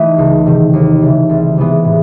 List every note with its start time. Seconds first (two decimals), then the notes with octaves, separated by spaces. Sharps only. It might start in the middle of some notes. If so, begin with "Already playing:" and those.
Already playing: E3 A3 D#4
0.18 C#2
0.46 C3 D#3
0.73 D#2
1.02 C#3 E3 A3
1.29 C2
1.57 C3 E3 G#3 B3
1.85 A2